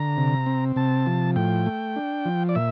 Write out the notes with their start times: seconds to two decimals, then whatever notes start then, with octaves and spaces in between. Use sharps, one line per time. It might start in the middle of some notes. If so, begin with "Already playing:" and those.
Already playing: D3 A#5
0.17 C3
0.46 C4
0.76 C3 A5
1.06 F3
1.36 A2 G5
1.66 A3
1.96 D4
2.25 F3
2.49 D5
2.55 A#2 E5